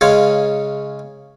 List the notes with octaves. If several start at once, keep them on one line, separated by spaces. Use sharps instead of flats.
C#3 G#3 C#5 F5 G#5